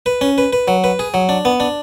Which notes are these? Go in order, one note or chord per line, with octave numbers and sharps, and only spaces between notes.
B4
C#4
B4
B4
F#3
B4
G#4
F#3
D4
B3
D4